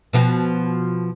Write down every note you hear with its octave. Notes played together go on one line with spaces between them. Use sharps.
B2 F3 F#4